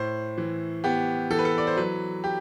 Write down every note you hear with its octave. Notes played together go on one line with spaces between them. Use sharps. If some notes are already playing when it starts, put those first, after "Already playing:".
Already playing: A2 C5
E3
B3 G4
E3 A4
B4
A4
D5
C5
F#3 B4
G4